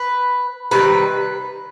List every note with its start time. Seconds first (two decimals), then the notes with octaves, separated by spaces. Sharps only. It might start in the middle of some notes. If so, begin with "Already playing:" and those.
Already playing: B4
0.71 C3 D#3 G3 B4